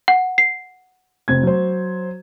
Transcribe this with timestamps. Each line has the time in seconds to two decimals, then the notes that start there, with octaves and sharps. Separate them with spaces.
0.08 F#5
0.38 C7
1.28 F1 C4 G#6
1.43 F#3 C5